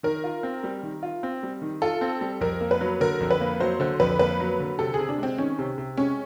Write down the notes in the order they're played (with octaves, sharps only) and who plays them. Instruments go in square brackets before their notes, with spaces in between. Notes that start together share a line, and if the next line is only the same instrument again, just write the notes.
[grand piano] D#3 [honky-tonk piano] A#4
[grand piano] F4
C4
G3
D#3
F4
C4
G3
D#3
[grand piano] F4 [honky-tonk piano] A4
[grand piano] C4
G3
[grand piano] F2 [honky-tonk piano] A#4
[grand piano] A#3
[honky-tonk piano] B4
[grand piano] F#3
[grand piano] D3 [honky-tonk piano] A#4
[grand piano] F2
[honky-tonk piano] B4
[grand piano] A#3
[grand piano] F#3 [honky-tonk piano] C5
[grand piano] D3 [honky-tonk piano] C5
[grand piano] F2 [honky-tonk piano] B4
[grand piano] A#3 [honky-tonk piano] B4
[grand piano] F#3
D3
[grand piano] C3 [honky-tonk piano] A4
[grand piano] C3 [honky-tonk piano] G#4
[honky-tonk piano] D4
[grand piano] G#3 [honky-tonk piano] C4
[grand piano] D#3 [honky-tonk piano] C#4
[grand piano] C3
C3
[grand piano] G#3 [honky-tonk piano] C#4